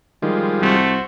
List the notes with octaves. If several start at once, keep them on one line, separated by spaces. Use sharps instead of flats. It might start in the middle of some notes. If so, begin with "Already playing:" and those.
D#3 F3 G3 G#3
C2 A3 F#4 C5